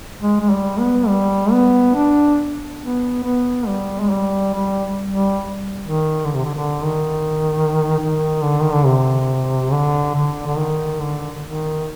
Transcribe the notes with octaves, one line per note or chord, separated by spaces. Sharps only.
G#3
G#3
G3
B3
G3
B3
D4
B3
B3
G3
G#3
G3
G3
G3
D#3
D3
C3
D3
D3
D#3
D#3
D3
D#3
D3
C3
D3
D3
D3
D#3
D3
D#3